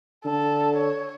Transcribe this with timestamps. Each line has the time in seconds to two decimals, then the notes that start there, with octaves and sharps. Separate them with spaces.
0.25 D3 A4
0.76 C#5